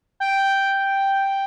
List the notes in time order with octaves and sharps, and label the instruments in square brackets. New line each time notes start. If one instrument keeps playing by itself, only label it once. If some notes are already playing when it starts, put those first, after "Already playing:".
[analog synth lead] G5